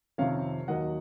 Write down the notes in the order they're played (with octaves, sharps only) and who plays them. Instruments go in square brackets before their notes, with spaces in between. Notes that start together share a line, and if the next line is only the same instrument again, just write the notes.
[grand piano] F2 C3 D#3 C#5 F5
D#2 D#3 F#3 D#5 F#5